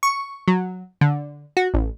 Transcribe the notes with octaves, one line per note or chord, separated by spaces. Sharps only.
C#6
F#3
D3
F#4
A1